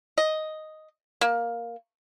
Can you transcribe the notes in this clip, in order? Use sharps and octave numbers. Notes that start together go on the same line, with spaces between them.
D#5
A#3